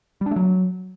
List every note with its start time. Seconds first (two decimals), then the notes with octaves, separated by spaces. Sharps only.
0.21 G3
0.26 D4
0.31 A3
0.36 F#3